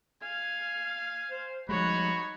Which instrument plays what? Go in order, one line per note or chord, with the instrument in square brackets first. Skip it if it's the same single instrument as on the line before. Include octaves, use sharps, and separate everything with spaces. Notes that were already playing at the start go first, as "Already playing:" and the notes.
[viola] F5 [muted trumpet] G#5
[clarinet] C5
[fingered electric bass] F3 G3 G#3 [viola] D#4 C#5 [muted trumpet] F#4 [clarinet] B5